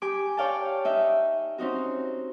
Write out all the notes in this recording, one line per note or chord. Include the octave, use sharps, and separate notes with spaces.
G4 G#5 D6
C#5 D5 F5 G5 A5
D#4 E5
C4 C#4 D#4 F#4